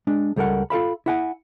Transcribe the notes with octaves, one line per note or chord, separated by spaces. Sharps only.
G#3 D4
C#2 G3 A4 A#4 F#5
F4 A4 F5 B5
E4 F#5 G#5